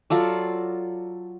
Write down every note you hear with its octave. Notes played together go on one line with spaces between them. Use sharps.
F#3 F4 A4 D5